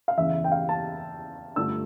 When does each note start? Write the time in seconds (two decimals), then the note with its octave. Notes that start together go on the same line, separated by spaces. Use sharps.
0.08 F5
0.18 E2 C#3 E3 E5
0.44 G5
0.52 F5
0.69 A5
1.56 G2 D3 A3 D4 F4 E6